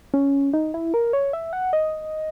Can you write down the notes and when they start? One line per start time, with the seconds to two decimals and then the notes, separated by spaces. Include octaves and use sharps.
0.14 C#4
0.53 D#4
0.74 E4
0.94 A#4
1.13 C#5
1.33 E5
1.53 F#5
1.73 D#5